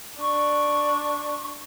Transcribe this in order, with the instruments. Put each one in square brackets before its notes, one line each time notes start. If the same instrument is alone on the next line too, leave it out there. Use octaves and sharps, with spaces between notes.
[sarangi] D4 [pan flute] C#6